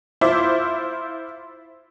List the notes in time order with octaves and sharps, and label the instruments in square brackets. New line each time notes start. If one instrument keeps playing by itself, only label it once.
[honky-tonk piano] E4 F4 C5 E5 D6